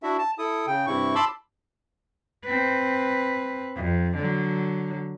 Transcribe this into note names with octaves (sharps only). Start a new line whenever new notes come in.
D4 E4 F#4 E5
A5
E4 A4 D#6
C#3 G5
G2 C3 E4 C#6
A5 B5 C6 D6 E6
C4 B4
F2
D3 F#3